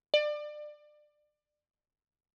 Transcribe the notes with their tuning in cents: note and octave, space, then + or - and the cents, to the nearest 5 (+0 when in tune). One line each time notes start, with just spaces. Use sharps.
D5 +25